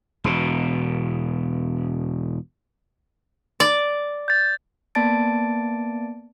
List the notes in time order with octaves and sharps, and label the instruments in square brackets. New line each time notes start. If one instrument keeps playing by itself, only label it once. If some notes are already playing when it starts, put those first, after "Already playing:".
[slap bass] E1 B2
[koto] D5
[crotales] G6 A6
[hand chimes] A#3 B3 D5 A5 A6 D7